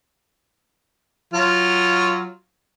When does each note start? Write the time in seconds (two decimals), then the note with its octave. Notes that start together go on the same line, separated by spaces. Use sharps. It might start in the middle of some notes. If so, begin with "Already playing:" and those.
1.34 F#3 F4